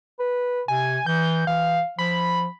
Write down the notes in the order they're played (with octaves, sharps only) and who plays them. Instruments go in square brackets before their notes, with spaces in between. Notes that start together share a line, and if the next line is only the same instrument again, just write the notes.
[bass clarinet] B4
[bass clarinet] C3 [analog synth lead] G#5
[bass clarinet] E3 [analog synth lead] G6
[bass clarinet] E3 [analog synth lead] F5
[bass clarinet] F3 [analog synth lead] B5